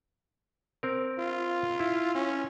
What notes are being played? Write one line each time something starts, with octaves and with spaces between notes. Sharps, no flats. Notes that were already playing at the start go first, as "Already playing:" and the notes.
C4 A#4
F4
E4
C#4